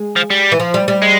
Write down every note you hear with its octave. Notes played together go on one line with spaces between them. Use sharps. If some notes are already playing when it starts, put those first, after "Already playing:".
Already playing: G#3
F3
G3
E3
F3
G3
G3
G#3